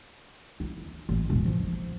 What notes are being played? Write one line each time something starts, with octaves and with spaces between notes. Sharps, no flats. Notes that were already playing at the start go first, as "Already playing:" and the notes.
E4
A1
E1
F3